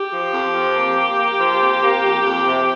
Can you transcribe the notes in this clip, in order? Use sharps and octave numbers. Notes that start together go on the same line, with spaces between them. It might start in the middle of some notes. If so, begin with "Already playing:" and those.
Already playing: G4
F3
F2
F3
A#3
A#3
A#3
F3
F2
A#3
F2
F2
C3